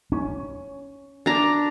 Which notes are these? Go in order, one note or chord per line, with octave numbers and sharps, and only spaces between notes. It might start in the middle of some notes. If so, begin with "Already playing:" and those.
C#4
D4 A#5